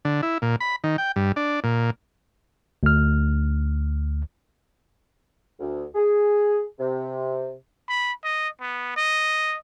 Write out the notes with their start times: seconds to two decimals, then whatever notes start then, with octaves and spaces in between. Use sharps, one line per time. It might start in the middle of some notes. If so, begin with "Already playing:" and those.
0.05 D3
0.23 E4
0.42 A#2
0.60 B5
0.84 D#3
0.98 G5
1.16 G2
1.36 D4
1.64 A#2
2.83 D2 F6
5.60 D2
5.95 G#4
6.79 C3
7.88 B5
8.24 D#5
8.61 B3
8.96 D#5